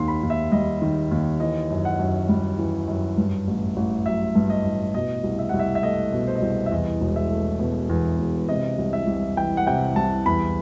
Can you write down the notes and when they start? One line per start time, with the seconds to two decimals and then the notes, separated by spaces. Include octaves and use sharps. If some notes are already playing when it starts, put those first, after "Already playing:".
Already playing: D#2 D#3 C6
0.08 B5
0.23 D#2
0.30 E5
0.52 G3 D#5
0.82 D#3
1.11 D#2
1.40 E3 D#5
1.70 F#2
1.85 F#5
1.99 F#2
2.29 G3
2.59 E3
2.88 F#2
3.18 G2
3.47 A1
3.76 A1
4.06 F#3 E5
4.35 G2
4.50 D#5
4.65 A1
4.94 B2 D#5
5.24 C2
5.39 E5
5.49 C2 F#5
5.59 E5
5.75 E5
5.83 A3 D#5
6.13 B2
6.27 C5
6.35 D#5
6.42 C2 C5
6.66 E5
6.71 E2 D#5
7.01 E1
7.16 E5
7.31 A3
7.60 B2
7.89 E2
8.19 E1
8.49 C3 D#5
8.78 C2
8.93 E5
9.07 C2
9.37 E3 G5
9.57 F#5
9.67 C3 G5
9.96 C2 A5
10.26 E2 B5